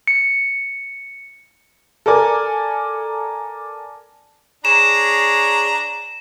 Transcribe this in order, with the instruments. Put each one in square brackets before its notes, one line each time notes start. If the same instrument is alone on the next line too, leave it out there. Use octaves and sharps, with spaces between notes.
[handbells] C#7
[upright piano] A4 A#4 D5 G#5
[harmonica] D4 A#5 [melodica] G#4 C#5 [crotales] E7